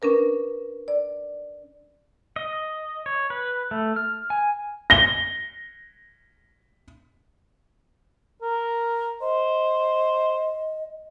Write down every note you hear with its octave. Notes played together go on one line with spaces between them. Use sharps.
C#4 D4 A#4 B4
D5
D#5
C#5
B4
A3
F6
G#5
A#6 G7
A#4
C5 D#5